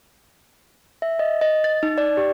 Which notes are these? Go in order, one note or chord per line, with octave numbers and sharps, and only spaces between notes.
E5
D#5
D#5
A6
D#4
D5
G4